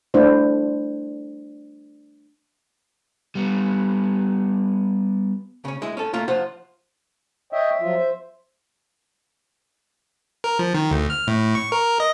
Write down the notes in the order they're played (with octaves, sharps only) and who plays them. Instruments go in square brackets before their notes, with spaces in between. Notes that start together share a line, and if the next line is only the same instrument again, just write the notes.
[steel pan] A3 D4 E4 C5
[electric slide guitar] G3 B3
[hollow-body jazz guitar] C#3 C#4
G#3 E4
C#4 A4
A3 A#3 F4 A#4
F4 C5 F5 F#5
[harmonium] C#5 D#5 G5 [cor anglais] E5
[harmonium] F3 F#3 F4
C5
[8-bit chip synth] A#4
F3
D#3
D2
F6
A2
C#6
A#4
D#5